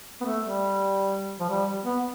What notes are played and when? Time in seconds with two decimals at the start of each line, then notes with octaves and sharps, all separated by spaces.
0.21 B3
0.25 A3
0.43 G3
1.40 F3
1.50 G3
1.85 B3